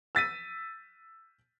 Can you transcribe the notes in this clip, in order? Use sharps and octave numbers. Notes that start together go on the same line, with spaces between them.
E6 A6 B6 D#7